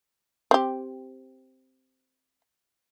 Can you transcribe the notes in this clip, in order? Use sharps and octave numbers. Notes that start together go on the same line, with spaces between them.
C4 G4